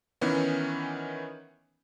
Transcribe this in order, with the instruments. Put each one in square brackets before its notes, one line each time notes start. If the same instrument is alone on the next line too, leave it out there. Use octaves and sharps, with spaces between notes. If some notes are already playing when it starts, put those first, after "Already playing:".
[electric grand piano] D#3 E3 B3 C#4